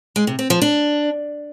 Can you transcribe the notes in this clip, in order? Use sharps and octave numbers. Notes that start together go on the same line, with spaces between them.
G#3
C3
C4
F3
D4